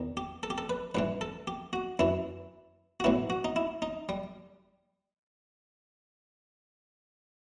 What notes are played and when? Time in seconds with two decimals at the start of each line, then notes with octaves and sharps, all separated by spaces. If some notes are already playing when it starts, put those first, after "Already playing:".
Already playing: E2 D#3
0.17 G4
0.43 A4
0.50 G4
0.58 A4
0.70 B4
0.95 A1 G2 E3 B4
1.21 A4
1.47 G4
1.73 F#4
1.99 F#2 E3 E4
3.00 F#4
3.04 B1 A2 E3 E4
3.30 F#4
3.45 D#4
3.56 E4
3.82 D#4
4.09 G3